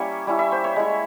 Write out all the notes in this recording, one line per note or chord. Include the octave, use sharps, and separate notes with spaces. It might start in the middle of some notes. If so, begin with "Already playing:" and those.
Already playing: G3 A#3 C#4 E4 C#5 E5
G3 C#4 E4
E5
C5
C#5
G#3 E4